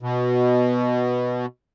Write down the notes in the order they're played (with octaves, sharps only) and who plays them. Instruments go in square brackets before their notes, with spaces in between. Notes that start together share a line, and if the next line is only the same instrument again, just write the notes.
[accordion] B2